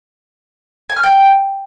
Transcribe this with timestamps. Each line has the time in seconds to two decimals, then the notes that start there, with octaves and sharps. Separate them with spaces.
0.90 G#5
0.96 F6
1.03 G5